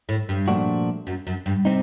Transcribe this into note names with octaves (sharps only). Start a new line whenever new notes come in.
A2
G2
A#2 F3 A3 D4 F#4
F#2
F#2
G2
C3 C4 D#4